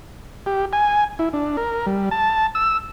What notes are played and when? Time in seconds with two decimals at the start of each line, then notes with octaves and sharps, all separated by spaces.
0.46 G4
0.73 G#5
1.19 E4
1.33 D4
1.57 A#4
1.86 G3
2.11 A5
2.55 E6